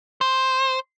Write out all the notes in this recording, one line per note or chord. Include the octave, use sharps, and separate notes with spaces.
C5